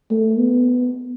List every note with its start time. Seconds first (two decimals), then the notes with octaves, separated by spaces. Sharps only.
0.11 A3
0.39 B3